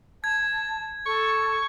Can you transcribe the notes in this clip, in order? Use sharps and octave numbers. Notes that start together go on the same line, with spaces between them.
A5 G#6
A4 C#6